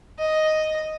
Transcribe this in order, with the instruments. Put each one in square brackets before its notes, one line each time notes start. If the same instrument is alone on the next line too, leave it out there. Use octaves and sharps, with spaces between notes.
[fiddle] D#5